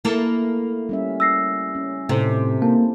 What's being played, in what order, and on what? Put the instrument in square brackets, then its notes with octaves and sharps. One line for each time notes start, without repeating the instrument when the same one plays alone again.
[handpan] A3 E4 [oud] A#3 A4
[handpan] G3 C#4 E5
[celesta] E6 A#6 C7
[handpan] C#4
[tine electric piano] A2 [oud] C3 [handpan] D#4 A4 C5
[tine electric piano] A#3 [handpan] E4 [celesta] A5